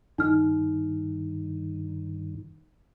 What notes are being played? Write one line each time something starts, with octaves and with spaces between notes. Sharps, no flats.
G2 D#3 D#4 F6